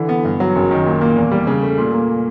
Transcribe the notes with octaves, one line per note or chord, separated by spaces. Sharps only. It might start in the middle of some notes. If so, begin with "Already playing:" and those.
Already playing: D3 E3
B3
G2
F#3
F#1
D#3
A#2
A#3
E2
G3
C#3
A3
A#2
A#3